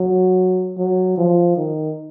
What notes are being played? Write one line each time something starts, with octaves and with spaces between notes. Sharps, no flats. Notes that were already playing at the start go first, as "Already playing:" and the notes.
Already playing: F#3
F#3
F3
D#3